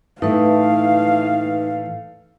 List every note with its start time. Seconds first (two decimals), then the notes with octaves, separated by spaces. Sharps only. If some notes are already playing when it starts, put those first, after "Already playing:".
0.22 A2 E3 A3 D#4 B4 F5